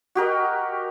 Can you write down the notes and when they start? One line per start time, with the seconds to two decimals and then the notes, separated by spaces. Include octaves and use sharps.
0.15 F#4 G4 A#4 D#5